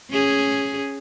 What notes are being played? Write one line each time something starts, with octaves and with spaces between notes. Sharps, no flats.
C#4 G#4